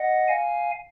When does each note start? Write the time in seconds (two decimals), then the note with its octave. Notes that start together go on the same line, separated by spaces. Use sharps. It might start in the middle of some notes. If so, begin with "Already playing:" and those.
Already playing: D#5 F#5
0.28 F5 G#5